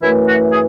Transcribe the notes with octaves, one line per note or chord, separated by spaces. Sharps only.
F#2 E3 A3 E4
F#4
G#4